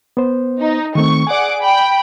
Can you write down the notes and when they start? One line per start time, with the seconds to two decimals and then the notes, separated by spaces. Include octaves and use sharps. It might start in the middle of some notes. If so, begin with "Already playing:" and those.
0.17 B3 C5
0.60 D#4
0.95 D#3 A3 C4 C#6
1.27 G#4 D5 F#5 G#5 D6
1.62 G5 B5